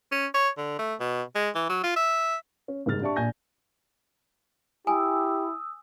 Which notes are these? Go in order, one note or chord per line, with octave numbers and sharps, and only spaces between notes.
C#4
C#5
D3
A3
B2
G#3
E3
F#3
F4
E5
C#4
F#1 G#2 G3 G#4 F6 A6
D4 G4 D5 E5 A5 C#6
A#1 A#2 G#5 G6 A#6
E4 G4 G#5 D#6 E6